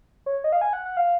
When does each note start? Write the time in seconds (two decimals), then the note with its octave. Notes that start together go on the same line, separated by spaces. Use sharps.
0.26 C#5
0.44 D#5
0.52 F5
0.61 G#5
0.73 F#5
0.85 F#5
0.97 F5